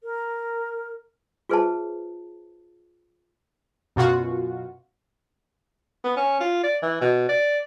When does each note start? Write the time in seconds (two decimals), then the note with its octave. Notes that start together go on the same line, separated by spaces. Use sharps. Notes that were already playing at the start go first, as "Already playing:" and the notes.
0.03 A#4
1.49 F4 G#4 B4 C5 E5 A5
3.96 F#2 B2 F4 F#4
6.04 B3
6.16 C#4
6.40 F4
6.63 D5
6.82 E3
7.01 B2
7.29 D5